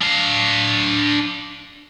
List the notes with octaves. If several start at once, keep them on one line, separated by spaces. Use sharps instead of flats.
D4 F5